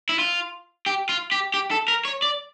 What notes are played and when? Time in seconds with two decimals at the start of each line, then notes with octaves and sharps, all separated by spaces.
0.09 E4
0.19 F4
0.86 G4
1.09 F4
1.32 G4
1.54 G4
1.71 A4
1.88 A#4
2.05 C#5
2.22 D5